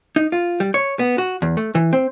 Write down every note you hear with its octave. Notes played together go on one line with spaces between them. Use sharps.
D#4
F4
G3
C#5
B3
F#4
E2
A3
E3
C4